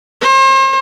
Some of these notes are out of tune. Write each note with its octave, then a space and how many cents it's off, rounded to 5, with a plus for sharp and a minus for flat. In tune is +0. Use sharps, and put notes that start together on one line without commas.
C5 +40